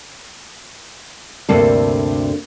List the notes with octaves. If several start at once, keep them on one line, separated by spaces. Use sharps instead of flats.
D2 G2 C3 A#3 A4